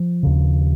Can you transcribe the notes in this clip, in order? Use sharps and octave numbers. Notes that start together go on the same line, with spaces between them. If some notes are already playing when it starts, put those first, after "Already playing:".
Already playing: F3
D#2 C#3